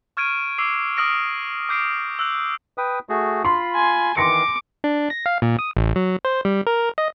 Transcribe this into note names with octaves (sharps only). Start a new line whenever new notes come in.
C#6 F6 G#6 D7 D#7
D6 E6 C7
D6 D#6 F6 A#6 D7
D6 G6 C7 D7
E6 F#6 F#7
B4 G5 D#6
A3 F#4 G#4
F4 B5 C6
G#5
D#3 E3 C6 D6 A#6 C#7
D4
A#6
F5
A#2
D#6
A1
F#3
C5
G3
A#4
D#5